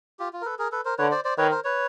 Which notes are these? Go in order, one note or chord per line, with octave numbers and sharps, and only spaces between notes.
F4 G4
F4
A#4
A4 B4
G#4 A#4
A4 B4
A#4 C5
D3 B4 C#5
C5 D5
C5 D5
D#3 B4 C#5
A#4 C5
B4 C#5